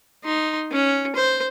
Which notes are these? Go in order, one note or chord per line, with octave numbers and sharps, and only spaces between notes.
D#4 C6
C#4
C5